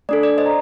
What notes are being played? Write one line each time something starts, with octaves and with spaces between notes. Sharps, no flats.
A3 D4 A4 D5
D5
C5 D#5
A#5